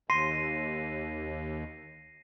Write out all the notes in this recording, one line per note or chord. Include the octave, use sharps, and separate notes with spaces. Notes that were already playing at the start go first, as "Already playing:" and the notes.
D#2 C6 A#6 C7 D#7